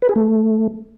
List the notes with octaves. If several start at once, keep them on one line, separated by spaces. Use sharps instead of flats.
B4
G#4
A3